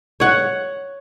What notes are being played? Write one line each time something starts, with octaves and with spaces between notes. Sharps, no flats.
C#5 F#5